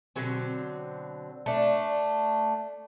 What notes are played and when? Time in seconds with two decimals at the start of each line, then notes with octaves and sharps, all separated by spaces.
0.16 B2 D3 F#3 C4
1.46 A3 D4